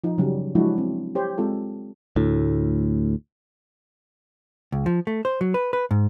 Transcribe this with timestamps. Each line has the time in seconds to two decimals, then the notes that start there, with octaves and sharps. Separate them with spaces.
0.04 F3 D#4
0.18 C#3 F#3 G3 C#4
0.55 F3 F#3 G#3 D4 E4 F#4
0.78 C4
1.15 G4 C5 C#5
1.38 G#3 C4 F4 A4
2.16 D2 A2
4.72 C#2
4.86 F3
5.07 A3
5.25 C5
5.41 F#3
5.54 B4
5.73 B4
5.91 G#2